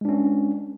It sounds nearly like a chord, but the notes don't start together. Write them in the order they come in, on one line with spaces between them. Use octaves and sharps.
G#3 D4 C#4